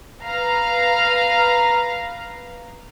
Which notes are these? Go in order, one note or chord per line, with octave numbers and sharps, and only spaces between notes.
B4 F5 A#5